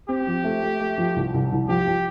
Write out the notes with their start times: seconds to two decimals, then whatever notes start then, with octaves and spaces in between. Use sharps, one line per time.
0.09 C4 G4
0.27 F3
0.44 A3
0.63 A3
0.80 A3
0.98 F3
1.16 C2
1.34 C2
1.52 C2
1.69 F3 G4
1.86 F3